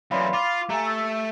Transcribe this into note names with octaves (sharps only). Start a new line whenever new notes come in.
F#2 E3 C#5 D5 F5 B5 C6
F4 F5 D6
A3 G4 G#5 A#5
E6 A6